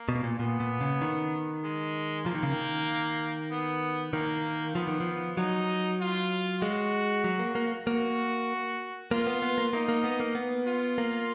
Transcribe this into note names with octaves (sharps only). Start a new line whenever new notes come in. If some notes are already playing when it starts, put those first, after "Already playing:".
Already playing: A#3
B2
A#2
A#2 B3
A#2
C#3
D#3
G#3
F3 A#3
D#3
C#3
D#3
B3
D#3 A#3
F3 B3
D#3
F3
F#3 D#4
F4
G#3 F#4
F#3
A#3
A#3
A#3 F#4
A#3 F4
B3
B3
A#3
A#3 D#4
A#3
B3
A#3
B3
F4
A#3